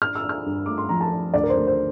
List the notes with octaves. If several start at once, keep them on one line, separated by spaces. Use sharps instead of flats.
D4 F6
E6
D4
F6
G2
A3 D6
C6
F3 A#5
A5
D4
D2 D5
A#4
C5
D2
C5